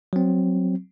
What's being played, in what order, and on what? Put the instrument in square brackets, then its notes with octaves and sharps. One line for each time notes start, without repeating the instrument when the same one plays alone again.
[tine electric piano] F#3 C4